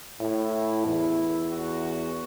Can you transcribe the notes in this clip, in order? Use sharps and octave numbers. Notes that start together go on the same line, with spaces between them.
A2 E4
E2
F#4